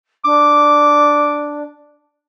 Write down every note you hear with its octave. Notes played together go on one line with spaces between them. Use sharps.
D4 D6